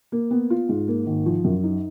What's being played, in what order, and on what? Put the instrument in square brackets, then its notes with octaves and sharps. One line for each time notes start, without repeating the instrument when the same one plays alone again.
[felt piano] A#3
B3
F4
G#2
A#3
G#1
F3
F#2
D#4